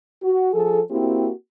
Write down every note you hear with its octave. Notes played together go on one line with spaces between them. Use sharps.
F#4
F3 G#4 A4
A#3 C4 E4 F#4 G4